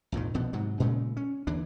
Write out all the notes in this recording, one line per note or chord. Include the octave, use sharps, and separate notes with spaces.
A#1 F2 G#2 D#3
C2 B2 F3 B3
G#2 C3 F#3
A#2 C#3 G#3 A3
C#4
D#2 D3 E3 D4